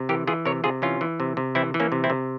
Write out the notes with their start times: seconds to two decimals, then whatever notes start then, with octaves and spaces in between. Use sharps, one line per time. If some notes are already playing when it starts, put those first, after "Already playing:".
Already playing: C3
0.09 E3 G4 A#4
0.27 E3 F4 G#4
0.45 C3 A#4 C#5
0.64 C3 F4 G#4
0.82 E3 C#4 F4
1.01 E3
1.20 C3
1.37 C3
1.55 E3 C4 E4
1.74 E3
1.80 A#3 C#4
1.92 C3
2.04 C4 E4
2.10 C3